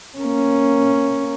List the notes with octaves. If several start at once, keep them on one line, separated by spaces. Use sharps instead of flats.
A#3 C#4